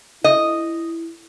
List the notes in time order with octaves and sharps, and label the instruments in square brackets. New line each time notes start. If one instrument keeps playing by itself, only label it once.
[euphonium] E4 [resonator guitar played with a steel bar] D#5